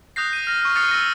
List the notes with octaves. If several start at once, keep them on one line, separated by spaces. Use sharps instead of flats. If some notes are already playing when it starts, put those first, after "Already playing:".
D#6 F#6 G6 A#6 C7
D#7
F6 A#6
C#6 F6
D#6 F6 F#6 A6 C7 C#7
E6 A#6